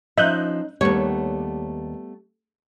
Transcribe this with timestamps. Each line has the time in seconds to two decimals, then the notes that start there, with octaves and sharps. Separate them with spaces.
0.18 F3 C#4 D#4 E5 F#6 G6
0.81 D#2 G3 A3 B3 C#5